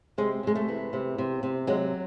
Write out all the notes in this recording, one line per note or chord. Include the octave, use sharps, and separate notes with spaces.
C3 G#3
C3 G#3
A3
E3
C3
C3
C3
F#3 G#3